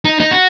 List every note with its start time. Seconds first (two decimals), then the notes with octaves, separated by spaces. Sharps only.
0.05 D#4
0.20 D#4
0.31 F#4